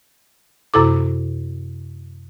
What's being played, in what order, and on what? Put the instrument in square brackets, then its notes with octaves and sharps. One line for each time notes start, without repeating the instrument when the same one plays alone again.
[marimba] F#2 C3 E4 A4 D6